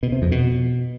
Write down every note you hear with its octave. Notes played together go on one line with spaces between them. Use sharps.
B2
C3
F2
B2